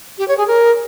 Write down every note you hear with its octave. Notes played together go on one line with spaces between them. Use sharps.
G4
C#5
G#4
A#4